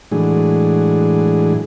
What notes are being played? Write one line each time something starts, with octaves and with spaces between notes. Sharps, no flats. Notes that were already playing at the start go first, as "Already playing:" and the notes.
A2 E3 F#3 G#3 D4 G#4